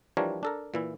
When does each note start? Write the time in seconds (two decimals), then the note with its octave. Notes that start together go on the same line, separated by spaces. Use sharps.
0.17 E3 F3 G3 D4 A#4 C#5
0.43 D4 A4 A#4
0.74 A#2 E3 E4